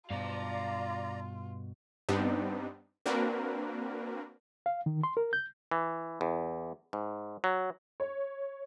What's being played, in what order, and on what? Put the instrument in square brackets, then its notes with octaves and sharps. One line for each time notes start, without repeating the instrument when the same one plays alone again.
[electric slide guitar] G2 B2 [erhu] F4 [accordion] D5 A#5 [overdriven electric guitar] F5 A5
[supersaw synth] G2 G3 B3 C4 D4 D#4
A#3 C4 D4 F#4 A#4 B4
[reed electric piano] F5
D#3
C6
A#4
G6
[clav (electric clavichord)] E3
E2
G#2
F#3
[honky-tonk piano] C#5